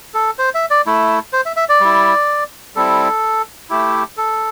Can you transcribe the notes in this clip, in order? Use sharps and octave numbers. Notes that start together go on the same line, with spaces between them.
A4
C5
E5
D5
A3 E4
C5
E5
E5
D5
G3 E4
G3 C4 E4 A4
A3 E4 G4
A4